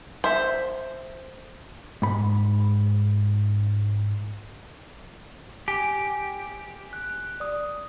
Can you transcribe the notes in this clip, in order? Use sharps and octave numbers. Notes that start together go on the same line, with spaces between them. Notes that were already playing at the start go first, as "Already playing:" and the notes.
C5 E5
G#2 B5
G4 G#5
F#6
D5 D#6